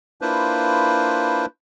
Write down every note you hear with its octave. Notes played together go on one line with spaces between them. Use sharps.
A#3 D4 E4 F4 B4 C5